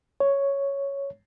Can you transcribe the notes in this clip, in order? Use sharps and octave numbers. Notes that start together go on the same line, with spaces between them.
C#5